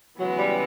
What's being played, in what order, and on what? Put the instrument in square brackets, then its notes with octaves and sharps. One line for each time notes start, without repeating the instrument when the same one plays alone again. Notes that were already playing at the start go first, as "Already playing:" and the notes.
[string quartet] C#3 E3 G#3 B3 [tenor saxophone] F#3
[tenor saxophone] G3